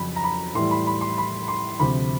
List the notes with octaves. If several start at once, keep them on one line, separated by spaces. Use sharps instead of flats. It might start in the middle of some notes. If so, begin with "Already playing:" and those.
Already playing: F2 C#3 F#3 B5
A#5
B5
A2 E3 G3 C6
B5
B5
C6
B5
C6
D2 C3 F3 B5